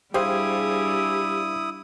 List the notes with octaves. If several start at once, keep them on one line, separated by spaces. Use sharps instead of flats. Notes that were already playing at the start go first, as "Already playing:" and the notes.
G3 D4 E4 G4 G#4 C5 F5 D#6